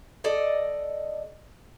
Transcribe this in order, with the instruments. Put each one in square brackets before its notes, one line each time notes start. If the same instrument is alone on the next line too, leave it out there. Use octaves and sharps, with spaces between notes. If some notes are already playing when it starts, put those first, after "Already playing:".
[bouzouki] A4 D5 D#5